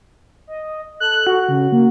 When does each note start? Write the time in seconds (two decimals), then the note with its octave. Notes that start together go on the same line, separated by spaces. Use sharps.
0.47 D#5
1.00 A4 F#6
1.27 F#4
1.48 C#3
1.72 A#3